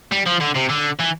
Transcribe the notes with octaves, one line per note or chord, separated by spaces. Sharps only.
G3
F3
D3
C3
D3
E3